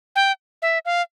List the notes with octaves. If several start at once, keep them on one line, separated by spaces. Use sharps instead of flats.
G5
E5
F5